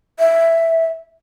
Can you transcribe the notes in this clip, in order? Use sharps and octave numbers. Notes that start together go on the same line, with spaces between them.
E5